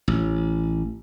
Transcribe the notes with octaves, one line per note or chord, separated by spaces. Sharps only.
A1